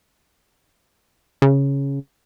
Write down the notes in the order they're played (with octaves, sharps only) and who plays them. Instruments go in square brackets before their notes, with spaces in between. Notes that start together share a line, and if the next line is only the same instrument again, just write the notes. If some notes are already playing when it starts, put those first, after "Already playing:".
[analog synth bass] C#3